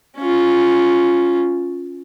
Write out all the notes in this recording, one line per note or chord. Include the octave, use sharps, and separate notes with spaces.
C#4 F4